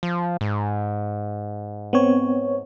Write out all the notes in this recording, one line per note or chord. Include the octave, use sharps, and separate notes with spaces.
F3
G#2
B3 C4 C#5